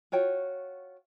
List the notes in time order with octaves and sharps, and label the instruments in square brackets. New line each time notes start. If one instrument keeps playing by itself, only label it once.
[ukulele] F4 F#4 C#5 G5